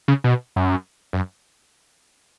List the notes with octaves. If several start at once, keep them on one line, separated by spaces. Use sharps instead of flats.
C#3
B2
F#2
F#2